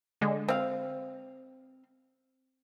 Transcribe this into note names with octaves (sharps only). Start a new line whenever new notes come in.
D3 G#3
C4 F5